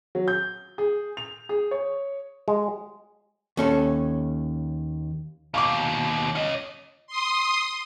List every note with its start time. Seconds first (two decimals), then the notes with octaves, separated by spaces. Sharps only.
0.15 F#3
0.28 G6
0.78 G#4
1.17 F7
1.49 G#4
1.71 C#5
2.48 G#3
3.57 D#2 C#4 A4
5.54 D#2 B2 F5 C#6 D6
6.35 C#4 D#5
7.07 C6 D#6